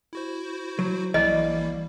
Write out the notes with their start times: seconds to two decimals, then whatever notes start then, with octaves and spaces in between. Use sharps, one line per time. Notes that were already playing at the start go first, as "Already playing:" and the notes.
0.13 E4 F#4 C5
0.79 F#3
1.14 A#1 E3 G3 A#3 D5 D#5